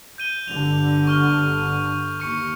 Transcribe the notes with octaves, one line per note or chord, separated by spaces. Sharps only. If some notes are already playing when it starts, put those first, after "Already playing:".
G6 D#7 G7
G1 G2 D3 F7
C#6 F6 G7
D#2 C#6 C#7